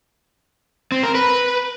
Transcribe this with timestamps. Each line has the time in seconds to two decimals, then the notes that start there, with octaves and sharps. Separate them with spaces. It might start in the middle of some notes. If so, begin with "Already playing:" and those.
0.92 C4
1.03 A#4
1.15 B4